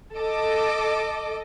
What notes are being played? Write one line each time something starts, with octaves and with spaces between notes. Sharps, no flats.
A4 D#5 D6